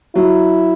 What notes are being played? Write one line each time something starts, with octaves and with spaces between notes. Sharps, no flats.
F#3 E4